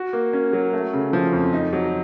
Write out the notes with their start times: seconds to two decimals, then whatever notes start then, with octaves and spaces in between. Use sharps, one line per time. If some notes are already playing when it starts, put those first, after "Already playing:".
Already playing: F#4
0.13 A#3
0.33 C#4
0.53 F#3
0.73 A3
0.93 C#3
1.13 F3
1.33 F2
1.53 D#4
1.73 F#3